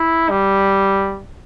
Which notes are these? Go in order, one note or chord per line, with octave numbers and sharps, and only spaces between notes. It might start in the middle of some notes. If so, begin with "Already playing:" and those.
Already playing: E4
G3